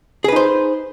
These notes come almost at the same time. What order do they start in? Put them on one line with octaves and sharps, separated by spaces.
G#4 B4 D#4 C5